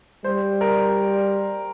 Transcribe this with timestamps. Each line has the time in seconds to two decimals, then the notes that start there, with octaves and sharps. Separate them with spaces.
0.24 G3 C5
0.61 A#4